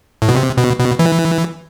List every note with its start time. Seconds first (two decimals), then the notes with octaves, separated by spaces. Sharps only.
0.22 A2
0.29 B2
0.37 C3
0.58 B2
0.79 B2
0.99 E3